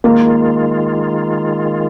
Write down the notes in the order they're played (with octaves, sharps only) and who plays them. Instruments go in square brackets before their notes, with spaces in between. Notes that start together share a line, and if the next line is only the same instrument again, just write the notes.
[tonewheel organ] D#3 G#3 F4 [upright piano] A#3